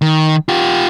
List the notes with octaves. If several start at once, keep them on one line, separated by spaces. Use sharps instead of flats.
D#3
F4 G4